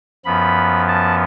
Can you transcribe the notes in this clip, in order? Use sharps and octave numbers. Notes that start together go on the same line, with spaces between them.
F#2 F3 B3 B5
A5